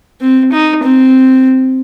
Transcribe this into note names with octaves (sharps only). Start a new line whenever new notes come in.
C4
D#4
C4